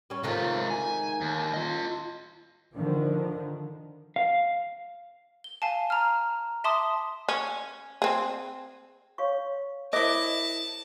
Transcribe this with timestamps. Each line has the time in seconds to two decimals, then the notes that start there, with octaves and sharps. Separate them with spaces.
0.10 G3 C#4
0.23 G#2 C3 D#3 A3 F4
0.70 G#5
1.21 D#2
1.54 F4 D#5
2.76 D3 D#3 F3
4.16 F5
5.44 G7
5.62 F5 G#5 A5
5.90 A#5 F6
6.64 E5 A5 C6 D6 D#6
7.29 C#4
8.02 C4 G#4
9.18 C#5 F5 C#6
9.93 E4 A#4 C5 D#5 A5 D6